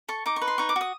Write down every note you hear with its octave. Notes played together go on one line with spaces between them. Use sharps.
A4 C#6
D#4 D6
C#6
B4
C6
D#4 C#6
D6
F#4 D#6